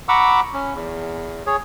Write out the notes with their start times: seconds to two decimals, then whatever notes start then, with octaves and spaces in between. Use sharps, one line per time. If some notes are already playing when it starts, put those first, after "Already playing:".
0.09 F#5 A#5 B5 C#6 D6 E6
0.54 C#4
0.74 E2
1.46 G#4 C#5